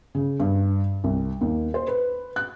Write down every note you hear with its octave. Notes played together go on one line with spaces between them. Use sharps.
C#3
G2
C2
D#2
C5
B4
F#6